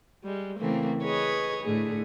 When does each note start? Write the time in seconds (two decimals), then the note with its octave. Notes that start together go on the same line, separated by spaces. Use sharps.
0.24 G3 G#3
0.59 C#3 E3 A3 A#3 C4
1.03 G#4 B4 C#5 D#5
1.62 A2 D3 A3 G#4